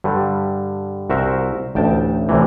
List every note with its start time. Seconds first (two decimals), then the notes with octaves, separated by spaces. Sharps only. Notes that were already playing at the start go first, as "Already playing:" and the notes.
0.04 G2 D3 G3
1.10 C2 F#4 A#4 C5 E5
1.75 A1 D2 G5 A5
2.29 D2 A2 C3 E3